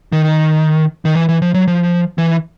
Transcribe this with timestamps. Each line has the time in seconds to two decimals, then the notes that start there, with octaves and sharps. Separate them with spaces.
0.12 D#3
1.05 D#3
1.15 E3
1.29 E3
1.42 F3
1.54 F#3
1.67 F3
2.18 E3